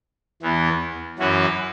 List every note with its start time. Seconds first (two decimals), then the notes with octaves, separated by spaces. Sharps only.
0.42 E2 E3 B3
1.19 F#2 E3 C#4 F#4 B4